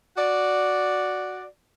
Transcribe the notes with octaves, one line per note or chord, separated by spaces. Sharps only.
F#4 D5